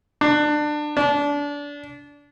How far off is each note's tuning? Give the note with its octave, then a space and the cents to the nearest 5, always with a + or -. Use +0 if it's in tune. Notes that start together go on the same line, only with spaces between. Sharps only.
D4 +25
D4 -25